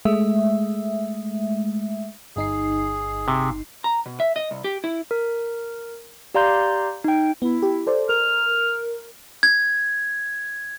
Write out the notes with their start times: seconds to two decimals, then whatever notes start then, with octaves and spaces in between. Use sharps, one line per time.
0.05 G#3 A3 E5
2.36 G1 D#4 G#4 C7
3.28 C3
3.84 A#5
4.06 B2
4.20 E5
4.36 D#5
4.51 C2
4.64 G4
4.84 E4
5.11 A#4
6.34 G4 D5 F5 A#5 C6 G6
7.04 D#4 G5
7.42 B3 E4
7.63 G4
7.87 A4 C5 D5
8.09 A#4 F6
9.43 G#6